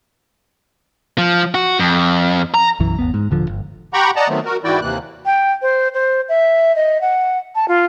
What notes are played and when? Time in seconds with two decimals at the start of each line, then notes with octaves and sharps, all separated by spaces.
1.18 F3
1.55 F#4
1.79 F2
2.54 A#5
2.80 B1 F#2 E3
2.99 G1 D#2 B3
3.14 G#2
3.31 D#1 D3 F3
3.49 G1
3.94 G4 F#5 G5 A#5 B5 C#6
4.16 D5 D#5 F#5 A5 A#5
4.29 D#3 F#3 A3 B3 C4
4.45 F#4 A#4
4.64 G#2 E3 E4 F#4 D5 G5
4.81 D#2 C3 E3 A#3 F#6
5.26 G5
5.62 C5
5.94 C5
6.29 E5
6.76 D#5
7.01 F#5
7.55 A5
7.68 F4